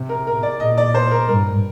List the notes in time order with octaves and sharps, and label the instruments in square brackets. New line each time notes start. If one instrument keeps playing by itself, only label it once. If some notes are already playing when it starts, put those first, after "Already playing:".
Already playing: [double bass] C3
[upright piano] A#4
A#4
D5
[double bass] A#2 [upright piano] D#5
[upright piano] D5
C5
A#4
[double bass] G2 [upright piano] A#4